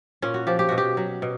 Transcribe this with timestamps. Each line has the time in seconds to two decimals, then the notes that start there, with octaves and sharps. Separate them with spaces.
0.22 A#2 C#4
0.34 F#4
0.47 F3 G4
0.59 G4
0.69 B2 F#4
0.78 G4
0.97 F#3
1.22 B2